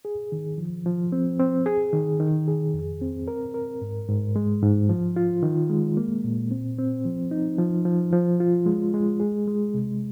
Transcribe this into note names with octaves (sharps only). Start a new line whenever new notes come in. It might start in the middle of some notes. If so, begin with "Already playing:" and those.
G#4
D#3
F3
F3
C4
C4
G#4
D#3
D#3
G#4
F2
C4
A#4
A#4
G#2
G#2
G#3
G#2
F3
F4
D#3
G#3
A#3
A#2
C4
C4
F3
D#4
F3
F3
F3
F4
G#3
G#3
G#4
G#3
C3